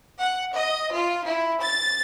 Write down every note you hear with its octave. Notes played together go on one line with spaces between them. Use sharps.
F#5
D#5
F4
E4
A6